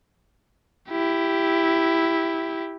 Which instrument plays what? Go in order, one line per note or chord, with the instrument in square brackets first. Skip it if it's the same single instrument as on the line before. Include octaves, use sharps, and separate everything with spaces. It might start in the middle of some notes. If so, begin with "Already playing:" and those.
[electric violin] E4 G4